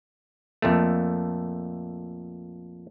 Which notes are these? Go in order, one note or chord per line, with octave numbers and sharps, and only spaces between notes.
F2 A#2 A3